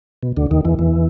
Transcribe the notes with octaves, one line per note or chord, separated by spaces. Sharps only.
B2
D2 D3
D#2 D#3
E2 E3
E2 E3